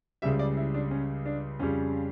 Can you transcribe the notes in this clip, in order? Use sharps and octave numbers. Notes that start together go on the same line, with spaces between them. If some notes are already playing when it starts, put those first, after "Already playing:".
C#2 C#3 G3 E5
D5
E4
D4
C#4
D4
F2 C#3 G3 C#4